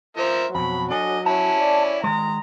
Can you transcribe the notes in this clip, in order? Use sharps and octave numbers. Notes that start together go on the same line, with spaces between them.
F3 A#4 C5 E5
F2 B2 F#3 B5
D4 A4 D#5 G#5
C#4 E4 A5
D5
D#3 G#3 A#5